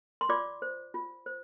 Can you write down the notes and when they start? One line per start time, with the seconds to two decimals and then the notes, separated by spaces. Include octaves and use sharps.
0.21 C6
0.29 F4 D5 D6
0.62 C5
0.94 F4
1.26 C5